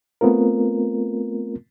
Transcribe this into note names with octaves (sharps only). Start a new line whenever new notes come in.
A3 B3 C4 F4 A#4